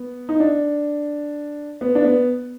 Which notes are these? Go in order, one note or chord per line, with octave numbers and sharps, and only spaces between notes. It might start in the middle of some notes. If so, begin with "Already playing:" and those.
Already playing: B3
D#4
D4
B3
D4
B3